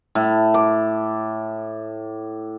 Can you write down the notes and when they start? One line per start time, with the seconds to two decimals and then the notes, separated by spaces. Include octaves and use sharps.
0.15 A2
0.54 D6